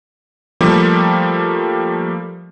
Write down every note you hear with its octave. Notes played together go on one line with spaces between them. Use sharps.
F3 G3 A3 A#3 G4